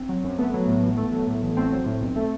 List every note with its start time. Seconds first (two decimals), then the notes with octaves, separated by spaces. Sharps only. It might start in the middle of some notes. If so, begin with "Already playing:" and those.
Already playing: C4
0.09 F#3
0.24 F#2
0.38 A3 B3
0.53 F#3
0.67 A2
0.83 A1
0.97 A3
1.12 F#3
1.27 A2
1.42 A1
1.57 A3 C4
1.71 F#3
1.86 A2
2.01 B1
2.16 A3